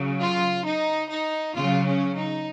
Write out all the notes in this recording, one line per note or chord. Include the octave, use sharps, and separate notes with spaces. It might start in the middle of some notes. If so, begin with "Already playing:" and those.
Already playing: C#3 F#3
F4
D#4
D#4
C#3 F#3 F4
C#4
D#4